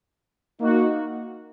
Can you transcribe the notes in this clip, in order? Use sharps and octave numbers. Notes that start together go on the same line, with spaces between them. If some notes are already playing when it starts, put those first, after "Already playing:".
A#3 D#4 F#4